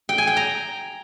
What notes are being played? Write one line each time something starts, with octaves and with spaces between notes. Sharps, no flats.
G5
G#5
G5
A#5